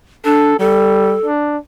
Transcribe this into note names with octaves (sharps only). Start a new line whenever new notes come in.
D4 A4
G3 A4
D4